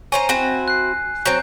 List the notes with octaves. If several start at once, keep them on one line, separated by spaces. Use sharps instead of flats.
C#4 C5 G#5 A#5 D#7
C4 E4 F#4
F#6 C7
F#3 C4 G6